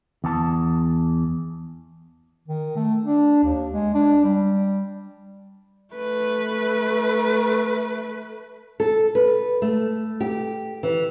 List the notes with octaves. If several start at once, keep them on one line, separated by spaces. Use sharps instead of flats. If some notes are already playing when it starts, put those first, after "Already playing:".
E2 A5
D#3
A3
D4
D#2
G#3
D4
G3
A3 B4
A4
B4
A3
G4
E3